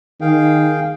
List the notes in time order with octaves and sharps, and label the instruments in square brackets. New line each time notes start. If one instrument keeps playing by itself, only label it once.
[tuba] D#3 [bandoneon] G#4 F5 G5